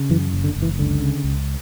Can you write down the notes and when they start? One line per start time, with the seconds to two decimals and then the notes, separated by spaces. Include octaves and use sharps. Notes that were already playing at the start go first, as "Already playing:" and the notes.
Already playing: C#3
0.10 F#2 E3
0.34 F#1
0.44 D3
0.56 F#1
0.62 E3
0.79 C#2 D3
1.02 C#3
1.24 C#2